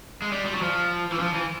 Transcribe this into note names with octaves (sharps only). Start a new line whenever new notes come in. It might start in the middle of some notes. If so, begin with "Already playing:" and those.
G#3
G3
G3
F#3
F3
E3
F3
E3